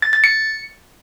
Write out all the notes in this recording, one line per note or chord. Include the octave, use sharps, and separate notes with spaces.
A6
A6
C#7